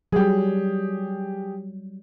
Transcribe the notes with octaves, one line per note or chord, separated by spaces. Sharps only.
F#3 G3 G4 G#4